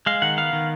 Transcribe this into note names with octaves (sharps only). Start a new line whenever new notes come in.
G#3 F5
D#3 F#5
B3 F5
D#3